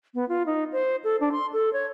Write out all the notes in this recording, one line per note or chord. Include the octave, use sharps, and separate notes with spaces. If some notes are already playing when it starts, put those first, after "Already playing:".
B3
F4
D#4
C5
A4
D4
C6
A4
C#5